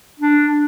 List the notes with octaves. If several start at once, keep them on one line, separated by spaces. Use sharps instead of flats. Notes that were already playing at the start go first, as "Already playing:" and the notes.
D4